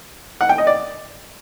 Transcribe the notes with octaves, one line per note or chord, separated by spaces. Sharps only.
F#5
G5
D#5
D5